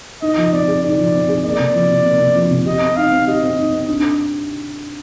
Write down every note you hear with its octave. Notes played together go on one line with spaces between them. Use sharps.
D#4 D#5
F3
C4 D5
G#4
D#4 D5
F3
C4
G#4
A#3 D5
C3
F3
C3
A#3
C3
F3
C3
G4 D#5
C4
D#4 F5
C4
G4 D#5
C4
D#4
C4
D4